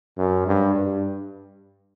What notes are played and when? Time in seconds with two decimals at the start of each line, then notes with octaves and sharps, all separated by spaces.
0.18 F#2
0.47 G2
0.75 G2